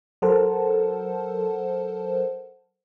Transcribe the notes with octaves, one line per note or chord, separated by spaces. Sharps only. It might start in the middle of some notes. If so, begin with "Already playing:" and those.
F#3 A4 A#4 C5 F#5 A5